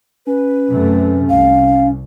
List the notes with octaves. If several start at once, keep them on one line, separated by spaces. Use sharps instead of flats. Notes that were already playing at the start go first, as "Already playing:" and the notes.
C#4 B4
F#2 C3 A3
C2 F5